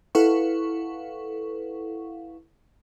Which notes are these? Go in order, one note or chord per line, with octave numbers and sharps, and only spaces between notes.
E4 A4 B4 F5 F#5 C#6